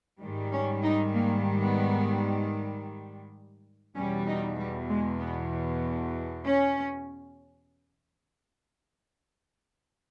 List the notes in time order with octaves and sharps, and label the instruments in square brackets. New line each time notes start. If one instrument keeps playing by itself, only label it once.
[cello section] G#2 D#3 G3
C#4
D#4
A#3
B3
E2 B2 G3 C#4
D#4
G3
G#3
B3
C#4